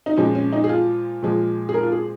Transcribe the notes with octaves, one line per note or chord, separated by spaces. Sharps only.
D#4
A#2 F3 G#3 C#4
C#4
D#4
G#4
F4
A#2 F3 G#3
G#4
A#4
F4
G#4